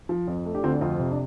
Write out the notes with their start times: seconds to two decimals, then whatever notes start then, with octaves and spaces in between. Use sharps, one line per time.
0.09 F3
0.27 F2
0.46 A3
0.55 D4 G4
0.63 D2 C4 F4
0.72 D4
0.81 F2 C4 F4
0.99 C3
1.11 D4